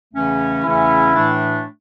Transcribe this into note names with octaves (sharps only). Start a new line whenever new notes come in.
E2 C#3 E3 A3 C#4
E2 C#3 E3 A3 C#4 E4
A2 E3 A3 D4